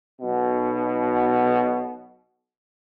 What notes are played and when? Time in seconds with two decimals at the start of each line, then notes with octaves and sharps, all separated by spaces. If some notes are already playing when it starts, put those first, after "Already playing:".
0.22 B1 B2